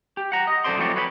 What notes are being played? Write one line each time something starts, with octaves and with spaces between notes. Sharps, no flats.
G4
F#5 A#5
D#5
F#2 E3 A4 C5 D5 C6
F3 F#3 A3 C4 C#5 D5
B4 C#5 F5 B5